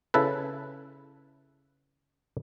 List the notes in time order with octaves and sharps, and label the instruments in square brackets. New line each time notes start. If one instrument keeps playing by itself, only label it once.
[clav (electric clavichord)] C#3 E4 A4 B4